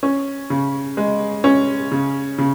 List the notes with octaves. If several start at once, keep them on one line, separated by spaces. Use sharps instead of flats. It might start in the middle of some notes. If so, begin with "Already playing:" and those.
C#4
C#3
G#3
C#4
C#3
C#3